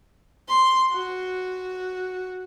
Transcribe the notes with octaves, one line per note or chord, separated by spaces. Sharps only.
C6
F#4